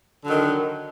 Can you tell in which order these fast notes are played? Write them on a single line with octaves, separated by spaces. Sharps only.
D3 F#3 D#3